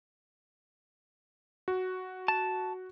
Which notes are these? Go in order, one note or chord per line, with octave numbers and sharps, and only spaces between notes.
F#4
A5